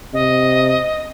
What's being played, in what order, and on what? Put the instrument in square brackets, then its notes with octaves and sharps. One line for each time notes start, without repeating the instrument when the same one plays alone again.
[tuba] C3 [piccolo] D#5